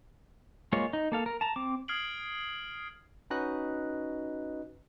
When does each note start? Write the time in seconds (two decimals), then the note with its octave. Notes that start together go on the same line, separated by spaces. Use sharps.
0.73 G#3 A#3 F4 C#5
0.93 D#4
1.12 A#3 A4 F5
1.26 A#4
1.41 A5 A#5
1.56 C4 D6
1.88 D#6 F6 G#6 C7 D7 F#7
3.30 C#4 D#4 F#4 B4 D#5 F#6